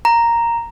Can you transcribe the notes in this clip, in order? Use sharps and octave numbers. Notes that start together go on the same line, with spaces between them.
A#5